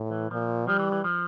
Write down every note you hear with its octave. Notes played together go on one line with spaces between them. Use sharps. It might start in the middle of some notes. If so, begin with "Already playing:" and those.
Already playing: A2
E3
A#2 F3
F3 G3
E3
E3
F3